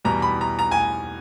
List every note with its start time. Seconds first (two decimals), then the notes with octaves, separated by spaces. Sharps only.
0.05 E2 B2 G3 A#5
0.22 B5
0.41 A#5
0.59 A#5
0.71 G#5